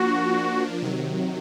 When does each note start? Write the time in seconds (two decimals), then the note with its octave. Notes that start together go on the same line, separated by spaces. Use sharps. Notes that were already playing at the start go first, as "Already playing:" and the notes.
Already playing: F3 A#3 D4 F#4
0.82 C3 D#3 F#3